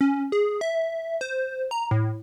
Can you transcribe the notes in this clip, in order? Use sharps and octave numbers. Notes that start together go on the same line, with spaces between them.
C#4
G#4
E5
C5
A#5
A2